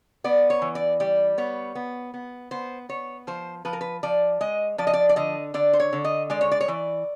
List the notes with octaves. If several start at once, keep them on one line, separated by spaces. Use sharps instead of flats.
B3 D5
C#5
E3
D5
G3 D5
B3 C#5
B3
B3
B3 C5
B3 C#5
F3 C5
F3 B4
A#4
B4
F3 D5
G#3 D#5
F3 D5
D#5
D5
D5
D3 D#5
D3 D5
C5
C#5
D3
D#5
G#3 D5
C#5
D5
C#5
E3 D5